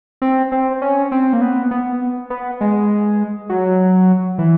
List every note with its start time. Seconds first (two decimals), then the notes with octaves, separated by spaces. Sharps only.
0.22 C4
0.52 C4
0.82 C#4
1.12 C4
1.33 A#3
1.42 B3
1.71 B3
2.30 B3
2.61 G#3
3.49 F#3
4.38 E3